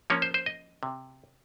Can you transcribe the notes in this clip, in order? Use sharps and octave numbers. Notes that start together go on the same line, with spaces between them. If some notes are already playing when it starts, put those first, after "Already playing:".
F3 A#3 C#4 C#5
C5
C5
D#5
C3